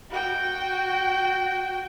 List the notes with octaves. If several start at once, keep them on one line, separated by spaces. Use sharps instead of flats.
F#4 G5